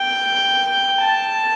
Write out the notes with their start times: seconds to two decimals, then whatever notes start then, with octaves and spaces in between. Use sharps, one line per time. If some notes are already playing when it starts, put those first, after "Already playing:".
Already playing: G5
1.01 A5